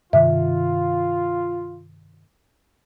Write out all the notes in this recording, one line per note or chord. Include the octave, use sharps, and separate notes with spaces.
G2 C3 D#3 F4 E5